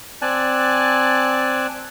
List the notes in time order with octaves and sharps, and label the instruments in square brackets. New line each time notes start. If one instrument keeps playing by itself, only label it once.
[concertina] C4 D5 G#5 A5 F#6